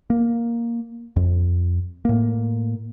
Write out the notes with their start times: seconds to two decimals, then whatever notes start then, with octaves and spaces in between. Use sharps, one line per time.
0.10 A#3
1.16 F2
2.05 A2 A#3